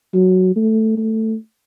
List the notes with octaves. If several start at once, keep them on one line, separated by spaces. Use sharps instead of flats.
F#3
A3
A3